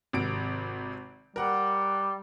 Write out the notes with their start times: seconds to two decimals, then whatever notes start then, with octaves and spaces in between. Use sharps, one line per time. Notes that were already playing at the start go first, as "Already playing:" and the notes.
0.13 G#1 C3 D7
1.36 G3 A#4 F#5